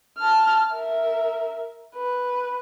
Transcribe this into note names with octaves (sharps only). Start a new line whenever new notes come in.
A5 F6
A#4 E5
B4